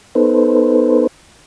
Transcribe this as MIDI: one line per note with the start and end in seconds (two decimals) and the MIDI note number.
0.15 1.07 59
0.15 1.07 63
0.15 1.07 69
0.15 1.07 71
0.15 1.07 72